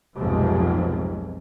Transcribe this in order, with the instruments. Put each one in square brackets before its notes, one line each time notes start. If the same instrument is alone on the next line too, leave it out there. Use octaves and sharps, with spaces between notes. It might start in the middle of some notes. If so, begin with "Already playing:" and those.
[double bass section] F1 B1 G#2 C3 F3